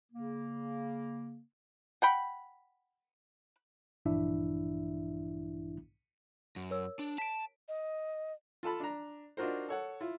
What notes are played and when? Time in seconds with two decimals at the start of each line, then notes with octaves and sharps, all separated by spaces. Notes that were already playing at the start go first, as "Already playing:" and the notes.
0.12 C#3 A#3
2.02 F#5 G5 B5
4.06 A#1 G2 E3 D4 E4 E5
6.56 F#2
6.71 A#4 C#5 E6
6.99 D4
7.18 A5 B6 D7
7.68 D#5
8.63 F4 A4 A5 B5
8.80 D4 A#5
9.37 D4 D#4 F4 F#4 A#4 C5
9.69 A4 C#5 F#5
10.01 E4 F4